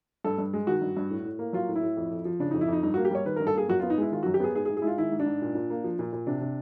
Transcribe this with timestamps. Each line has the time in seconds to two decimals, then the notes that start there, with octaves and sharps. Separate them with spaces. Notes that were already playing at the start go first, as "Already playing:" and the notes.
0.24 G2 A4
0.38 G2
0.53 G#3
0.67 D#3 F#4
0.82 G2
0.97 G2
1.11 A2
1.25 A2
1.39 A#3
1.53 F#3 F4
1.68 A2
1.76 E4
1.82 A2
1.97 F2
2.11 F2
2.25 F3
2.40 C#3 D4
2.51 D#4
2.54 F2
2.61 E4
2.68 F2 D#4
2.83 G2 D#4
2.94 F#4
2.97 A#3
3.05 G4
3.11 G3 C#5
3.25 D#3 B4
3.36 A#4
3.40 G2
3.47 A4
3.54 A#3 G#4
3.69 F#2 F#4
3.79 F4
3.83 B3
3.90 D#4
3.98 G#3 E4
4.12 D#3 F4
4.23 F#4
4.26 F#2
4.34 G4
4.40 B3 G#4
4.55 G#2 G#4
4.65 G#4
4.69 G#2
4.77 G#4
4.82 G#3 E4 F4
4.98 D#3 E4
5.12 G#2
5.20 D4
5.26 G#2
5.42 A#2
5.55 A#2
5.70 A#3
5.84 F3
5.99 A#2
6.13 A#2
6.27 C3 D4
6.41 C3